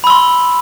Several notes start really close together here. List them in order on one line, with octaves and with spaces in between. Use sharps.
B5 E6 C6